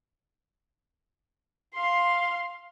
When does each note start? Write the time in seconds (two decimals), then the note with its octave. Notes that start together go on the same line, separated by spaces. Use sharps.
1.75 F5 C6